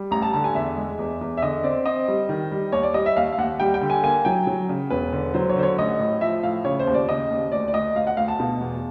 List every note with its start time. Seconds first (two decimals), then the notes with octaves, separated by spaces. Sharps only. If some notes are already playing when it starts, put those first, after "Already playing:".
Already playing: G3
0.11 A1 A#5
0.22 A5
0.33 D3 A5
0.44 G#5
0.54 E2 E5
0.77 G#3
0.99 E2
1.21 E2
1.37 E5
1.42 D3 D#5
1.63 C4 D5
1.86 C4 D#5
2.08 G3
2.29 D#3
2.51 G3
2.72 D#2 C#5
2.83 D5
2.94 G3 D#5
3.06 E5
3.16 D#2 F5
3.32 F5
3.38 D#2 F#5
3.60 G3 G5
3.74 G5
3.81 D3
3.90 G#5
4.03 A#3 G#5
4.25 F#3 G5
4.47 F#3
4.69 C#3
4.90 E1 B4
5.13 D3
5.34 F#3 C5
5.49 C#5
5.56 D3 C5
5.63 C#5
5.78 A1 D#5
6.00 A2
6.21 F3 E5
6.43 A2 F5
6.64 C#3 C#5
6.79 C5
6.87 D#2
6.94 D5
7.09 C#3 D#5
7.31 D#2
7.52 D2 D5
7.68 D5
7.73 D2 D#5
7.96 D2 F5
8.07 F#5
8.17 D2 F5
8.28 A5
8.40 B2
8.61 E2